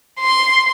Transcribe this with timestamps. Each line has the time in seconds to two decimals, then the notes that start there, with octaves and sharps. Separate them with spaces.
0.20 C6